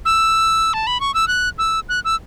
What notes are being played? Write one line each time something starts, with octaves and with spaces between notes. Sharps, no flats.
E6
A5
B5
C#6
E6
F#6
E6
F#6
E6